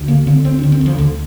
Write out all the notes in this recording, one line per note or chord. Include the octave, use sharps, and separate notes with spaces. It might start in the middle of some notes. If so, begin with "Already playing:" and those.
Already playing: D2
D3 A#3
D3 C4
D2 C4
D4
D3
C4
D2 F3
D2 D3